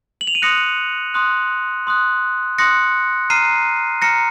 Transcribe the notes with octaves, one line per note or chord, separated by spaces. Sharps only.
F#7
F7
D#7
C6 D#6 F#6 A#6 C#7
C6 D#6 F#6
C6 D#6 F#6
C6 D#6 F#6 A#6 C#7
A#5 F6 C7 D#7
A#5 F6 A#6 C#7